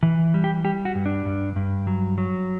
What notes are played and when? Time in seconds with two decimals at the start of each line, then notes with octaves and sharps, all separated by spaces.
0.03 E3
0.34 G3
0.44 G4
0.64 G3 G4
0.85 F#4
0.95 G2
1.06 D4
1.26 G2
1.56 G2
1.87 F#3
2.18 F#3